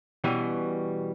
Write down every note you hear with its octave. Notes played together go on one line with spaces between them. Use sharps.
B2 E3 G3 C#4